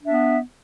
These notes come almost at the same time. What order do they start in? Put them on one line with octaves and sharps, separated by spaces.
D4 E5 B3